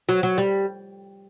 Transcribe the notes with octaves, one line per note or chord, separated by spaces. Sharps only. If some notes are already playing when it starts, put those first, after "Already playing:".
F#3
F#3
G3